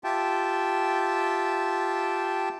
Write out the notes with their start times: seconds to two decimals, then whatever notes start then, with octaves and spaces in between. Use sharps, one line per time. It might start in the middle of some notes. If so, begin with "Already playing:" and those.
0.04 F4 G4 E5 G5 A5